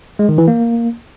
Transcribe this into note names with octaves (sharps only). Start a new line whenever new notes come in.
G#3
D#3
E3
A#3